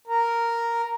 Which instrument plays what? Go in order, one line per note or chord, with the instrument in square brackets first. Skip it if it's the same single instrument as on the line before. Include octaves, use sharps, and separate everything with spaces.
[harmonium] A#4